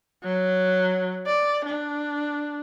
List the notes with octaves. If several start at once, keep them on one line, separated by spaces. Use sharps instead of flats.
F#3
D5
D4